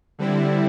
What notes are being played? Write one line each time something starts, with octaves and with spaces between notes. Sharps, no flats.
D3 G3 C4 E4